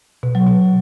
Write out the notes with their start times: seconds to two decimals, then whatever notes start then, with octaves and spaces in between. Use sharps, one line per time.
0.23 B2
0.35 F#3
0.47 B2